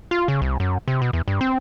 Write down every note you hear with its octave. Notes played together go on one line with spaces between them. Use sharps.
F4
C#3
C2
F#2
C3
B2
E2
G2
C4